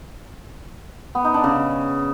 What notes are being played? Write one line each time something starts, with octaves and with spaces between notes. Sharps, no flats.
B3
D#4
D4
C#3